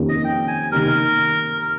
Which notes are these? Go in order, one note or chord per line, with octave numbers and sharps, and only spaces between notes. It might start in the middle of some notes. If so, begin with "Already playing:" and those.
Already playing: F2 D#3 A#3 C#4 G4
D#5
G5
G#5
D#3 A#3 D#4 G4 A#4